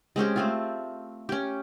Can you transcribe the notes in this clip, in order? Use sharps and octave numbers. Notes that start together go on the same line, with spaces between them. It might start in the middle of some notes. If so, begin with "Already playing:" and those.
G#3 C4 C#4 G4
A3 C4 F4
C#4 G4